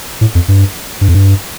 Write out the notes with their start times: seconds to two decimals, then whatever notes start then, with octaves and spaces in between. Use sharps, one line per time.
0.21 A2
0.35 F2
0.48 G2
1.01 G2
1.09 F2
1.14 G2